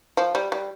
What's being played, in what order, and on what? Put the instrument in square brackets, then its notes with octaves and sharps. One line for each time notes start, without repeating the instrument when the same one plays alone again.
[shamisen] F3
G3
G3